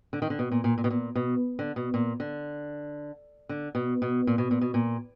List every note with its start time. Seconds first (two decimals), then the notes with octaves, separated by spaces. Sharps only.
0.13 D3
0.22 D#3
0.30 D3
0.39 B2
0.51 A#2
0.64 A#2
0.78 A#2
0.84 B2
0.90 A#2
1.15 B2
1.59 D3
1.76 B2
1.94 A#2
2.20 D3
3.49 D3
3.75 B2
4.02 B2
4.27 A#2
4.38 B2
4.51 A#2
4.61 B2
4.74 A#2